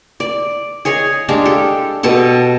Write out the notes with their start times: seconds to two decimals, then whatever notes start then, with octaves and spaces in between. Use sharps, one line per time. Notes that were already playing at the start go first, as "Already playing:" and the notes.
0.20 D5
0.85 G#4 C#5 D#5 G#5
1.28 G#3 D4 G4 F5
1.45 G4 A4
2.03 B2 G4 A4 A5